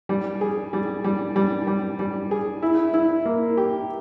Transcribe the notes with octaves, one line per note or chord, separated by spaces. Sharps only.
G3
G#4
G3
G3
G3
G3
G3
G#4
E4
E4
A#3
G4